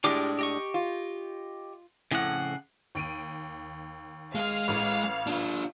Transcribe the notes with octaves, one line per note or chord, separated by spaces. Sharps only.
A2 G#3 D4 F4 G4 D6
G4 D#5 C#6
F4
F2 A2 C#3 F#5
D#2 D7 D#7
G#3 G#4 F5 F6
A1
D4 F4